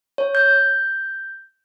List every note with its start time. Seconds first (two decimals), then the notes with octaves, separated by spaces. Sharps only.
0.18 C#5
0.35 G6